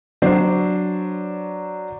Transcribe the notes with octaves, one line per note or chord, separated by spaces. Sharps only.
F#3 D4 C5 D5